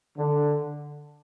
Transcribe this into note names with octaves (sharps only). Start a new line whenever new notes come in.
D3